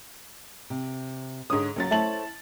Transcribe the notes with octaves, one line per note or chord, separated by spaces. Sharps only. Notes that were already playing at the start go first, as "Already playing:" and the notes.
C3
G#2 D3 C#5 D#6
C#2 F#3 A#3 C#4 A6
A3 E4 C5 C#5 A5 F#7